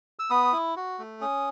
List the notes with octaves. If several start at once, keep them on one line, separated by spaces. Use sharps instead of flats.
E6
B3 D#6
E4
F#4
A3
C#4 D#6